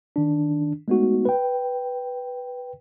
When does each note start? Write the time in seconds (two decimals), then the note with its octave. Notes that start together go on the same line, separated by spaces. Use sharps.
0.16 D#3 D4
0.88 G#3 A3 B3 D#4 F#4
1.25 B4 G5